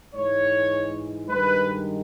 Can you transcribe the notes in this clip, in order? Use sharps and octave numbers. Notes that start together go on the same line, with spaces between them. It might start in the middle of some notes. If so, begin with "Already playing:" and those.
G#2 E3 G#3 C#5
G2 D#3 G#3 B4